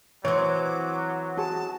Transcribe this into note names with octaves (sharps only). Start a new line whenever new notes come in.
E3 F#3 C4 C#5 D6
F#4 G#4 A5